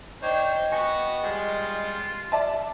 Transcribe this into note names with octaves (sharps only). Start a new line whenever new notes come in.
D4 D#4 C5 C#5 D#5 G5 D6
B3 F#4 G#5 C#6 A#6
G3 G#3 F4
D5 E5 A5